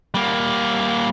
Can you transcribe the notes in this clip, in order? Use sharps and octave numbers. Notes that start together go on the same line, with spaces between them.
G3 A#3